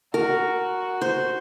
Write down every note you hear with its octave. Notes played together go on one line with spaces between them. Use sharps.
F#4 A#4
C5